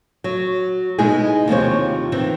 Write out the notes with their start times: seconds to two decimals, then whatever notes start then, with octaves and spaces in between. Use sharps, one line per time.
0.24 F#3
0.98 B2 G#3 D#4 E4 G#4
1.48 D#2 C3 F3 C#5
2.12 D#3 E3 C4